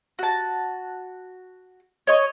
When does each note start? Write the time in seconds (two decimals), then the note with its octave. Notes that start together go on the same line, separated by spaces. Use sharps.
0.19 F#4 A5
2.07 C#5 D#5 C#6